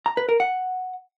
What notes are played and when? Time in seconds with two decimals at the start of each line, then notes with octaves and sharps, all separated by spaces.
0.06 A#5
0.17 B4
0.29 A#4
0.40 F#5